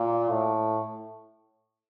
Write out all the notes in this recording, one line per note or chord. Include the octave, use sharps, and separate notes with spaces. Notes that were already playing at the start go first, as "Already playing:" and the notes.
Already playing: A#2
A2